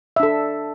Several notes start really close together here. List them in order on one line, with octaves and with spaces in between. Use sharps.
E5 D4 A4